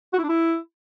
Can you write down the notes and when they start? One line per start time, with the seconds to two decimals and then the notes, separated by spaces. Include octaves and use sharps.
0.13 F#4
0.18 E4
0.24 D4
0.29 E4